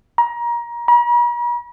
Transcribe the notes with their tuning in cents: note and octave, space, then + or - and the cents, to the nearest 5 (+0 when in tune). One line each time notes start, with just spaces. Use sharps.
A#5 +25
A#5 +45